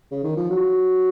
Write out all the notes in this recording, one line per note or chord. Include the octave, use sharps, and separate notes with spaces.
C#3
D#3
F3
F#3